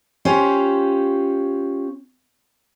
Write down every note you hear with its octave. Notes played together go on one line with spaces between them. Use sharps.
C#4 F4 G4 C5